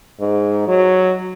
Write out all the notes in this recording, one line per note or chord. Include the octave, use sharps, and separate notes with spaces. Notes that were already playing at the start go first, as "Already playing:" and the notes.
G#2
F#3